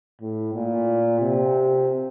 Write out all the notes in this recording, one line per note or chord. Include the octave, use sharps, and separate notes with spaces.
A2
A#2
C3